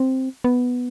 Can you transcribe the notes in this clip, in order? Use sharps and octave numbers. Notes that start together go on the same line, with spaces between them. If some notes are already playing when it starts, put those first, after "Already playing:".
Already playing: C4
B3